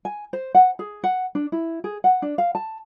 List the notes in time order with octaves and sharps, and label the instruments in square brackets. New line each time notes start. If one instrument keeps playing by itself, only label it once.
[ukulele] G#5
C5
F#5
G#4
F#5
D4
E4
G#4
F#5
D4
F5
A5